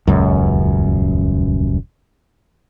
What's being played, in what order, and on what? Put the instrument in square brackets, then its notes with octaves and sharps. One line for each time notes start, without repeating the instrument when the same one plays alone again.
[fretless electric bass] D#1 C#2 F#2